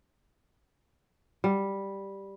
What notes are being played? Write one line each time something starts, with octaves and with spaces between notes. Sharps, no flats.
G3